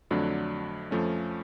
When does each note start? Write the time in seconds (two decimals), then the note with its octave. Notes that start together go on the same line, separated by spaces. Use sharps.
0.11 F2 D3 F#3 A3 D4
0.91 F2 F3 A3 C#4